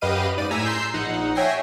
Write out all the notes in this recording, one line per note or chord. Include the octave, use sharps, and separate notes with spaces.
F#2 G4 B4 D#5 F5 D#7
G#2 D5 D#7
A2 G#5 A#5 E6 B6
A#5 C6 E6 G6 C7
A#1 D#4 F#5
C#5 E5 G5 G#5 A#6 C7